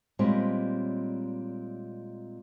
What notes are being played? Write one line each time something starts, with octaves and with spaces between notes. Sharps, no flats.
A#2 G3 G#3 C4 C#5 D#5